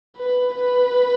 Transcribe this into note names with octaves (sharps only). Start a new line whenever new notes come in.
B4
B4